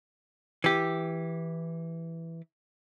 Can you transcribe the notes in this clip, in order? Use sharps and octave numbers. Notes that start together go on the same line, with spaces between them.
E3 G4